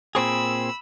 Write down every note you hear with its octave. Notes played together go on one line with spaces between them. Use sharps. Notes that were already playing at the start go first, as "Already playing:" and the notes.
A#2 C4 G#4 B5 E6